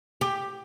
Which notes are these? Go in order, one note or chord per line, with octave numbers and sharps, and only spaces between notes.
G4